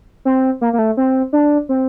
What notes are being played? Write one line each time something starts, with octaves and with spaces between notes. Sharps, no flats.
C4
A#3
A#3
A3
C4
D4
C4